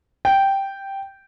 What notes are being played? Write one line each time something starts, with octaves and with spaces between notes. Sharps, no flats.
G5